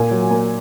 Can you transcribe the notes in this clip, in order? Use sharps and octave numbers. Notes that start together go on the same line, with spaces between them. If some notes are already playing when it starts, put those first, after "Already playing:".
Already playing: A#2 G#5
F#3
A#3